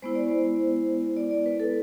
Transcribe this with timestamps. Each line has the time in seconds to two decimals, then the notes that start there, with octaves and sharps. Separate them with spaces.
0.02 G#3 B3 E4 C5
0.15 D5
0.28 C5
1.17 D5
1.31 D5
1.46 B4
1.60 A4